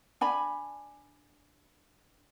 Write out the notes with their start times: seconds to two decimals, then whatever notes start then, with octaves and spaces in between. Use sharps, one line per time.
0.21 D4 G#5 B5